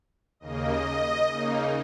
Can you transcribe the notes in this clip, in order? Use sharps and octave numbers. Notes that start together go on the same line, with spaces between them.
D#2 C#3 A#3 D#5
C#3 A#3 D#4